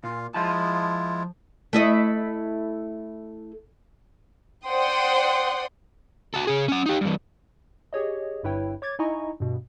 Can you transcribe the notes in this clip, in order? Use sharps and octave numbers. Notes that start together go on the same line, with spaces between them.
A#2 F4 F5
F3 G#3 E4 F4 A5
A3 E4 D#5
C5 D5 F#5 G5 C6 D#6
F#4 A4
C#3 G#4
C#4 F#5
D#4 G4
G2 E3
G4 G#4 C#5 D#5
G1 G2 E4 B4 C#5 G5
C#5 D6 G#6 A6
D#4 E4 D#5 G#5 A#5 C#6
G2 B2